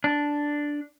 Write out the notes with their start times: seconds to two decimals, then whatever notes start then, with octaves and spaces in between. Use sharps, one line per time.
0.04 D4